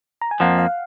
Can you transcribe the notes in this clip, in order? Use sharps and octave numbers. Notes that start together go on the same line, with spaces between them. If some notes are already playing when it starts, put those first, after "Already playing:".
A#5
G#5
F2 F3 A#3 F#5
F5